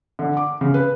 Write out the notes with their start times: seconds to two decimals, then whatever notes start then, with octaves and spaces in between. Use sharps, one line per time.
0.19 D3
0.37 D6
0.61 C#3
0.74 B4